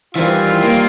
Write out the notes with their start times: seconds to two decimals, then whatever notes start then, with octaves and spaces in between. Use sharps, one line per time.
0.15 D#3 E3 G3 C4 F4
0.63 A#3